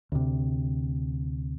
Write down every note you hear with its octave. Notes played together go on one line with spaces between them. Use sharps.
D2 C3